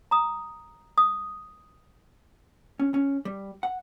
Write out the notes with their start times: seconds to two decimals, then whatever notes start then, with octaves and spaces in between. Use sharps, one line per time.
0.11 A#5 D#6
0.98 D#6
2.79 C#4
2.94 C#4
3.25 G3
3.63 F#5